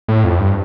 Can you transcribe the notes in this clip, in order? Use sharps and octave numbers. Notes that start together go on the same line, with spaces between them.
A2
F2
G2